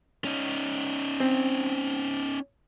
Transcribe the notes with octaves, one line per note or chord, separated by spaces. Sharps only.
C#4 D#4
C4